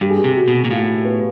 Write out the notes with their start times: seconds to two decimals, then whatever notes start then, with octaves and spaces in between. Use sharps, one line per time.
0.01 G2 G4
0.10 G#4
0.18 G4
0.24 C3
0.36 F#4
0.48 B2
0.64 A#2
0.71 A2 F4
1.05 B3